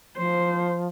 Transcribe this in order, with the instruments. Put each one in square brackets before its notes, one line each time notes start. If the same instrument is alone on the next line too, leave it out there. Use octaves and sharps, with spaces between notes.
[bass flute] F3 [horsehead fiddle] C5